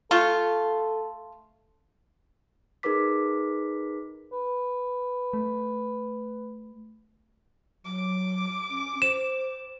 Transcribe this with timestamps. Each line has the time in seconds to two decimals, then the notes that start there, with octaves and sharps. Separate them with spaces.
0.11 A3 F4 A4
2.83 D#4 G#4 A#4 B4 D6 B6
4.32 B4
5.33 A3
7.85 F#3 D6
8.71 C#4
9.02 C5 E7